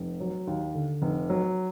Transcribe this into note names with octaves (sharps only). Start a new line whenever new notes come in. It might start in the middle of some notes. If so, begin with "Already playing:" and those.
Already playing: F1
F#3
D#2
D3
F1
F#3